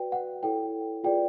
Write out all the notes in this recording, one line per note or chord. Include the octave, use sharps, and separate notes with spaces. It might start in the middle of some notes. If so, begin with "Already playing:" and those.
Already playing: F#4 B4 D5 G5
F#5
E4 A4 C#5 G5
F4 G#4 B4 D5 G5